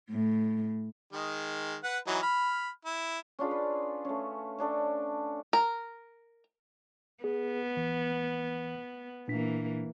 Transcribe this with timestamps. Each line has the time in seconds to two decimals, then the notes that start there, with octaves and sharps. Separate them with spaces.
0.11 A2
1.13 D#3 G#3
1.84 B4 F#5
2.07 E3 F#3 D#4
2.22 B5 F6
2.85 E4
3.39 C#4 D4 F4 G#4
3.51 B4
4.05 A3 C#4
4.59 C#4 D4 A4
5.53 A#4
7.24 B3 G#4
7.77 G#1 E3
9.28 A#2 E3 A#3 D4 B6